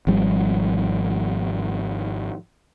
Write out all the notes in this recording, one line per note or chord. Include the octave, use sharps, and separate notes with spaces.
G#1 F3 G3